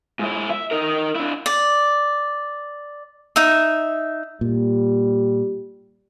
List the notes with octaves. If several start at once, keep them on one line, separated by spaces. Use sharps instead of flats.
G#2 E4
E5
D#4 A#4
D4 E4
D5
D#4 E5
A#2 G3